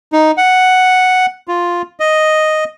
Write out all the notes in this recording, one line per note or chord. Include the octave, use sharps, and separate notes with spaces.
D#4
F#5
F4
D#5